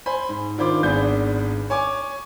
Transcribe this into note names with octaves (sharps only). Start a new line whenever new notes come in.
C5 G#5 B5
G#2
D#3 D4 F4 C5 B5 D6
G#1 B3 D4 G#4 G6
C#5 G#5 D6